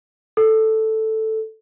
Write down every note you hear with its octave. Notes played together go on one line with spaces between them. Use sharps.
A4